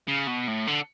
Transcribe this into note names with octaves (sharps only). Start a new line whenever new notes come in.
C#3
B2
A2
D3